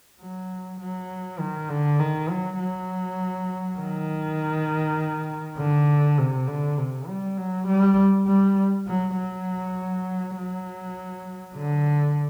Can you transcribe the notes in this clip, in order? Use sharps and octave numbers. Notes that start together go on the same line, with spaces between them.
F#3
F#3
D#3
D3
D#3
F#3
F#3
D#3
D3
C3
D3
C3
G3
F#3
G3
G3
F#3
F#3
F#3
D3